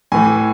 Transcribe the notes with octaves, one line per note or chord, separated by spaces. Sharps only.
A2 E3 G#5